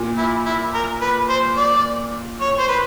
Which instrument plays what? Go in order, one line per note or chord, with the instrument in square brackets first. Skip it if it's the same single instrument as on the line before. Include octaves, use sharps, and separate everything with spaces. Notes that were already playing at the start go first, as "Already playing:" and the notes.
Already playing: [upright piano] A#2
[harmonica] E4
E4
A#4
B4
C5
D5
C#5
C5
B4